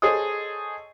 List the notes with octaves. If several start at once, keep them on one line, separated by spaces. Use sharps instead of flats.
G#4 A4 C5 C#5 D#5 D#6